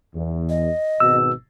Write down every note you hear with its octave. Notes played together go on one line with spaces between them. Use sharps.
E2
D#5
G#1 B2 E6